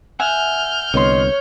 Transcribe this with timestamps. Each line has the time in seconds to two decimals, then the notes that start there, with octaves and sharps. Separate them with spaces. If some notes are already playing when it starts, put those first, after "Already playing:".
0.20 E5 F#5 G#5 F6 G6
0.94 C2 D3 B3 C#5 D#5 C6